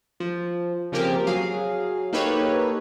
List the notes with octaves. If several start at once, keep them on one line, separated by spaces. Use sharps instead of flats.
F3
C#3 F3 A#3 C4 G4 A#4
F#3 G#4 F5
A#3 D#4 G4 A4 B4 C#5